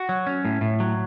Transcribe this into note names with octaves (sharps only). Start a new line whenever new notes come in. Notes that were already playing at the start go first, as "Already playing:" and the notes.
Already playing: F#4
F#3
C#4
A2
A2
F#3